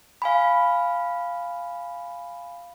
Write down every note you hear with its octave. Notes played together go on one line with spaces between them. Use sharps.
F5 G#5 B5